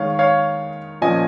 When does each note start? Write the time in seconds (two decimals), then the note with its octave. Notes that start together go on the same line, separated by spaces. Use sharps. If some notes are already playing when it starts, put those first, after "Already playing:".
Already playing: D#3 G#3 D#4 C#5 F5
0.19 C#5 F5
1.01 A#2 F3 C#4 D#5 G#5